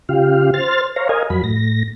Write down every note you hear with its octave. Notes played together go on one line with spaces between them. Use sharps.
C#3 F4 G4 F5
C5 F6 A6
C5 C#5 F5 A#5
A#4 D#5 F5 G#5
F2 F#3 B5
A2 A#6